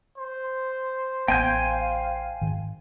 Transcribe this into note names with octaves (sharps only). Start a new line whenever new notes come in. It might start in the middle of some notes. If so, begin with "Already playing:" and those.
C5
A1 B3 F5 G5 G#5 G6
G#2 D#3